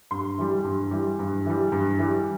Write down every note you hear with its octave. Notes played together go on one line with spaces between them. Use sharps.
G2 C6
E3 G3
G2
E3 G3
G2
E3 G3
G2
E3 G3